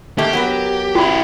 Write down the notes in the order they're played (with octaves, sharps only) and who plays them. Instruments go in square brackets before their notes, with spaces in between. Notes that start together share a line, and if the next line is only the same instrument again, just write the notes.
[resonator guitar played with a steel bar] D#3 A3 A#3 [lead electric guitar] G4
[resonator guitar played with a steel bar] F#3 B3 A#4
[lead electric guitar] E4 G4 [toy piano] F#4 B5